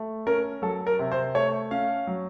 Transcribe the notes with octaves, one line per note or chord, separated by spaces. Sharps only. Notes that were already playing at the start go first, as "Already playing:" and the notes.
Already playing: A3
C#4 A#4
F#3 A4
A#4
C3
C5
A3 C#5
C#4 F5
F#3